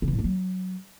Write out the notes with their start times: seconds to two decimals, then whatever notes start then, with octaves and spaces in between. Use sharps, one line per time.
0.02 C#3
0.08 E3
0.13 A2
0.19 A#3
0.24 F#3